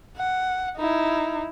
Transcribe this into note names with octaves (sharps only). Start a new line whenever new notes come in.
F#5
D#4 E4